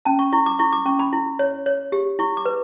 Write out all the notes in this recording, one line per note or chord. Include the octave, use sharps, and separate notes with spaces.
C#4 A5
C#6
E4 C#6
D6
E4 C#6
D6
C#4 C#6
B5
E4
C#5
C#5
G4
E4 C#6
D6
B4